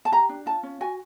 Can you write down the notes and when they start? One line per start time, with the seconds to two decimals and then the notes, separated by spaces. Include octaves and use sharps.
0.05 A5
0.12 G4 A#5
0.29 D4
0.46 F4 A5
0.63 C#4
0.81 F#4 G#5